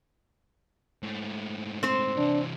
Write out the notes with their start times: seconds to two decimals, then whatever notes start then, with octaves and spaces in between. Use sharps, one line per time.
1.03 G#2 A3
1.83 C4 C5
2.17 C3 E3 D4